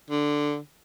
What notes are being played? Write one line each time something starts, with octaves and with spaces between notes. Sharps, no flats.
D3